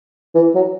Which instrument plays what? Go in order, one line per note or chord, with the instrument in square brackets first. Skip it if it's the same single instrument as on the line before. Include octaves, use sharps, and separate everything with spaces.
[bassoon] E3
F#3